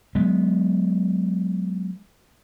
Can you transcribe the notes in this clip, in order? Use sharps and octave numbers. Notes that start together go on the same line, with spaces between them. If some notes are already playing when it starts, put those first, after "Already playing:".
F#3 G#3 B3